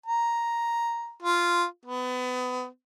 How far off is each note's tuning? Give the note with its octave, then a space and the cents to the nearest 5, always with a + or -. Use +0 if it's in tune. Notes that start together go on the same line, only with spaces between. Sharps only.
A#5 +5
F4 -5
B3 +30